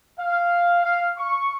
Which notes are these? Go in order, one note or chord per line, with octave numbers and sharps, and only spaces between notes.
F5
F5
C#6